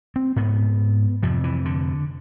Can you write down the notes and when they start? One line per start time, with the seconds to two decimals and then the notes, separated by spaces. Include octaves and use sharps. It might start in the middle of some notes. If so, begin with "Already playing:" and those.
0.16 C4
0.36 G#2 B3
1.23 F2 C3 F3
1.44 E3
1.65 D3